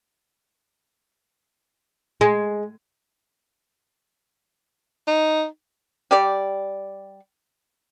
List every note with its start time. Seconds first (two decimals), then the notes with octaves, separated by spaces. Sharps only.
2.21 G#3
5.07 D#4
6.11 G3 G4 D5